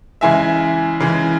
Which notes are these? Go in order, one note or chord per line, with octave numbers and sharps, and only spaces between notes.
C#3 E3 G#3 E5 G#5
C#3 E3 G#3